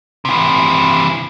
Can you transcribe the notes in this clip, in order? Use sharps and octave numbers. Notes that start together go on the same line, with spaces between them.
C3 E3